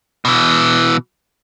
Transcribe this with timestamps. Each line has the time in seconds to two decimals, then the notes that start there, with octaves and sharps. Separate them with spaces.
0.25 B2 E3